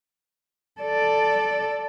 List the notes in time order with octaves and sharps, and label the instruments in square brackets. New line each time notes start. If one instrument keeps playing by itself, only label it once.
[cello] A4 D5